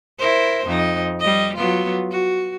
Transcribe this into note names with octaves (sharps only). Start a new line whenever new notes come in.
E4 A#4 C5
F2 D#4
G3 D#5
F#3 B3 F4
F#4